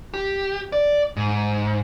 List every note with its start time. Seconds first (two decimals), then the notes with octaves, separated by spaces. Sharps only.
0.14 G4
0.72 D5
1.17 G#2